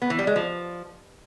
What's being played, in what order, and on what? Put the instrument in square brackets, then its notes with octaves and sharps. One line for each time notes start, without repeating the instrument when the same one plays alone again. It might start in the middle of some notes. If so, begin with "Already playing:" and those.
[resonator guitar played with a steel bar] B3
E3
G3
G#3
F3